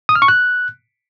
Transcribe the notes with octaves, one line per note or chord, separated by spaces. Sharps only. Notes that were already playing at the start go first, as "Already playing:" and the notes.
D#6
F6
C#6
F#6